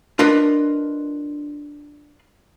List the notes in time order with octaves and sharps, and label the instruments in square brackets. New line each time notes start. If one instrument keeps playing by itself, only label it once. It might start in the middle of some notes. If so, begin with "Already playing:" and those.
[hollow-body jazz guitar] D4 F4 A#4 B4 D#5